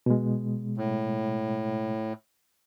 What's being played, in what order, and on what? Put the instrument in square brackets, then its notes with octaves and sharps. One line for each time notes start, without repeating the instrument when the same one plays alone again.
[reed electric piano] B2 G#3
[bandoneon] A2